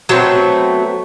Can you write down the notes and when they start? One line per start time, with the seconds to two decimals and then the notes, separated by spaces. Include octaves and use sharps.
0.09 F#3 A3 B3 C4